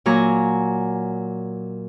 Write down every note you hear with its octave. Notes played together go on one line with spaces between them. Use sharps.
A#2 F#3 G#5 A#5 C#6